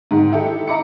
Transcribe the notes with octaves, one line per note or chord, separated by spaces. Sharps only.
G#2 D#3
E4 G4 A4 E5
E5 A#5 B5 D6 C#7